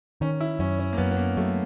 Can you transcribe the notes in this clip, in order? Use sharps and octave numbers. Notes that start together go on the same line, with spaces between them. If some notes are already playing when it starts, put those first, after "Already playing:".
D#3 C#4
E4
F#2 C#4
C#4
A#3
F#2 B3
B3
A#3
F#3 A3